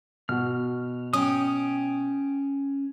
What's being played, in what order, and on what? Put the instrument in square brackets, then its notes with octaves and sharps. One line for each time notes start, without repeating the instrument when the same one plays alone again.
[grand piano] B2 F#4 [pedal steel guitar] F6
[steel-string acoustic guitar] C#4 [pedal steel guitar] G5 D#6